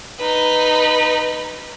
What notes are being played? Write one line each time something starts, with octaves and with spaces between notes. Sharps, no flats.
D#4 B4